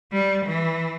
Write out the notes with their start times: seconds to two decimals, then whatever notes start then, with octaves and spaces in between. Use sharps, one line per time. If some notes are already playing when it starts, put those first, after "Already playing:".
0.12 G3
0.45 E3